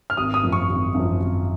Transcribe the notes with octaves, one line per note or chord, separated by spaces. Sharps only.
F6
G#1 D#6
D#6
F#2 F3
C#6
G#1
F#2
F3
G#1